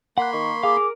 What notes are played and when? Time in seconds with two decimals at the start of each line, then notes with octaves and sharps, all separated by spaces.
0.18 A#3 F#5 B5 C6 F#6
0.33 D#3 C#6
0.63 G#4 F5 D6
0.77 A#4